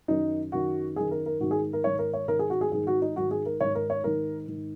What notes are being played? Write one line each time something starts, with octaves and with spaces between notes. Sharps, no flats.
F#2 D#3 D#4
F#2 D#3 F#4
F#2 D#3 G#4
A#4
A#4
G#2 D#3 F#4
G#4
A#4
G#2 D#3 C#5
A#4
C#5
G#2 D#3 A#4
G#4
F#4
G#4
G#2 D#3 G#4
F#4
D#4
G#2 D#3 F#4
G#4
A#4
G#2 D#3 C#5
A#4
C#5
G#2 D#3 A#4
G#2 D#3